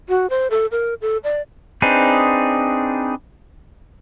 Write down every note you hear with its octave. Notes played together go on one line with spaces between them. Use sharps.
F#4
C5
A4
A#4
A4
D5
C4 D4 D#4 G#4 B4